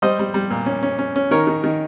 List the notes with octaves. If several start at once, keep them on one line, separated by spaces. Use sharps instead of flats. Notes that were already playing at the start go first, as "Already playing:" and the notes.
G3 C5 D#5
G3
G3
A#2
C#4
C#4
C#4
C#4
D#3 A#4 C#5
D#3
D#3